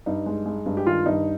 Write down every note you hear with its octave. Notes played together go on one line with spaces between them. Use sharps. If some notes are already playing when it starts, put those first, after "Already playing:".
G2 D#4
G#3
G#3
G2
G4
D#3 F4
G2 D#4